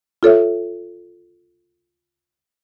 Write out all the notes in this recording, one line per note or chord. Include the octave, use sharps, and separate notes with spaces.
F4 A4 C#5 E5